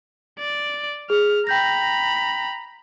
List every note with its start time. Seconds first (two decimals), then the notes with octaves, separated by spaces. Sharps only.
0.39 D5
1.10 G#4 F6
1.47 G5 A#5 B5 G6 A#6